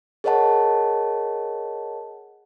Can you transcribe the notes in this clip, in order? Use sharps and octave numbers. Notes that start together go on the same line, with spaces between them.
G#4 A#4 C#5 D#5 F#5 A5